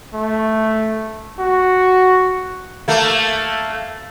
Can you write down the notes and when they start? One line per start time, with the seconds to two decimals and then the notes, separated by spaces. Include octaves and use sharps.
0.14 A3
1.39 F#4
2.88 A3 A#3